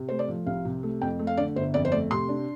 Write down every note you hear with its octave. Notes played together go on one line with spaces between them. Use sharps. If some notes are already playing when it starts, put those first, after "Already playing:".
Already playing: C3
A3 C5
D5
F3
C2 F5
C3
A3
F2 G5
A3
F5
D3 D5
G1 C5
F2 D5
C5
A3 D5
C3 C6
D4